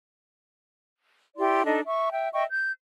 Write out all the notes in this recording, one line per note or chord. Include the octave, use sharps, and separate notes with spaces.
E4 G4 D5 C6
D4 D#4 A4 D#5
E5 C#6
E5 G5
D#5 E5 G5 C#6
G6